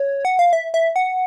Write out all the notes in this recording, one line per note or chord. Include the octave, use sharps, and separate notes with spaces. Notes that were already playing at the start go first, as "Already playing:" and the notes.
Already playing: C#5
F#5
F5
E5
E5
F#5